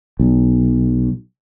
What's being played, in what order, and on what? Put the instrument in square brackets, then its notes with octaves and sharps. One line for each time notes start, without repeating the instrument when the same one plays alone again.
[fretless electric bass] B1